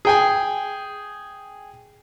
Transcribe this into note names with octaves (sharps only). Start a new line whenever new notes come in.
G#4 G5 G#5